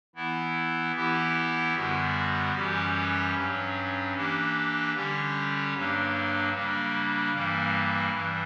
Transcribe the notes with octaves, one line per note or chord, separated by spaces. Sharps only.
E3 B3 E4
E3 B3 E4 G4
F#2 D3 G3 B3 F#4
F#2 E3 G3 C#4 G4
G2 F#3 C#4
E3 A#3 D4 G4
D3 G3 C#4 G4
G2 F#3 A#3 D4
C#3 G3 A#3 D4
G2 E3 G3 A#3
G2 E3 G3